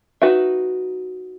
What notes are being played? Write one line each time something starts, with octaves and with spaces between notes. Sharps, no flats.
D#4 F#4 B4 E5